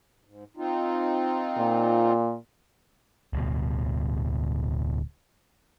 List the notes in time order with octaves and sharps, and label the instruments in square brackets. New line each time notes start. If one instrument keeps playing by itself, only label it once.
[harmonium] G#2
C4 D#4 F4
[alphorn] A#2
[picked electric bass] D1 D2 B2